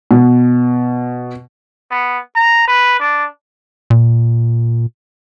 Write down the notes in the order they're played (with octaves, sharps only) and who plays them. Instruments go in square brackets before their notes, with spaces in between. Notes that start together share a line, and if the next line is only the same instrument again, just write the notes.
[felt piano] B2
[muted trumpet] B3
A#5
B4
D4
[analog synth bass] A#2